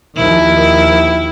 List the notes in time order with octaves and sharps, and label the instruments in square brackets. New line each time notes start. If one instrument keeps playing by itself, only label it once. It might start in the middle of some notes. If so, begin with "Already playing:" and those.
[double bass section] D#2 D#3 F3 [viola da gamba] E4